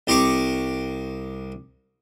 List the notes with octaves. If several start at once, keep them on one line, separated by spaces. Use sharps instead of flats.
C2 G4 C5 A#5 C#6 D6